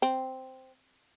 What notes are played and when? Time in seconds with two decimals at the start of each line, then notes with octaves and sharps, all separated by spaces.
0.02 C4